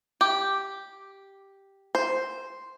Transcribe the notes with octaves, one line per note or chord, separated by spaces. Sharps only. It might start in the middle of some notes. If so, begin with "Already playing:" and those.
G4
C5